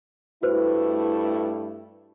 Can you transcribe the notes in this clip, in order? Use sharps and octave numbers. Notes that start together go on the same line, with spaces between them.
G2 A3 E4 F#4 B4 C5